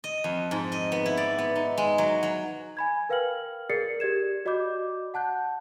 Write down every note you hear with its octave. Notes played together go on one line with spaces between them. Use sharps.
D#5
F2
G#2
D#5
B3
E4
D5
B3
D#4
G#3
F#3
F#3
G#5 B5 G#6
A#4 B4 F5 G5 F6 F#7
G#4 A#4 D5 A6 C7 C#7
G4 D5 G#6 E7
F#4 D5 D#5 B5 D6 G6
F#5 A5 F#6 G6